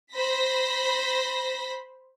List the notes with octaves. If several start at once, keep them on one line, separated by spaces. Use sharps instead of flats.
C5 B5 A#6 B6